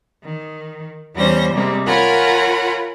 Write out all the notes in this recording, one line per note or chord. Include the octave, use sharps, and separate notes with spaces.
D#3
E2 G3 C#4 C5 A#6
C3 G3 G#3 A#3 C4
F4 A#4 C#5 F#5 G#5 B5